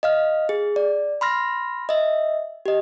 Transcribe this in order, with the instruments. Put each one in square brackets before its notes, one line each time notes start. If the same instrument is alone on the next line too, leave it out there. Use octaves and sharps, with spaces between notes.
[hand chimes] D#5 F5 F6
G#4
D5
B5 C6 F6 A#6
D#5 E5
G4 D#5